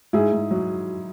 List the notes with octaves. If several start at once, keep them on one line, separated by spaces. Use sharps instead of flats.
G#2 E4 G#4
G#2
F#3